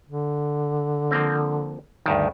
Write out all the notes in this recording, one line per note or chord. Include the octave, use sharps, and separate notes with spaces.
D3
F3 A#3 C4
D2 G2 D#3